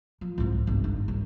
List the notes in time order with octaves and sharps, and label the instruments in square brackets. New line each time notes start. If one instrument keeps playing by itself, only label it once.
[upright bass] F3
C2 G#2
G1
G#2
C2